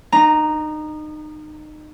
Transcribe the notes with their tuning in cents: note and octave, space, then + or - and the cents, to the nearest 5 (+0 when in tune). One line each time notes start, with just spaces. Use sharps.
D#4 -30 A#5 +0